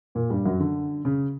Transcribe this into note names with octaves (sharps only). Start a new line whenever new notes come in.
A#2 A#3
G2 G3
F#2 F#3
D3
C#3